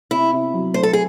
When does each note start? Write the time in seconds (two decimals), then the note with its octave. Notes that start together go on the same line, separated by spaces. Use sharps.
0.11 C3 E4
0.32 C3
0.53 F#3
0.74 A3 C5
0.83 A4
0.93 G#4